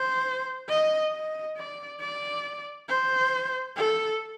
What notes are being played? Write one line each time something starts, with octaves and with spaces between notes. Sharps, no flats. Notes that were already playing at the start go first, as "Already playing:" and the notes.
Already playing: C5
D#5
D#5
D5
D5
C5
A4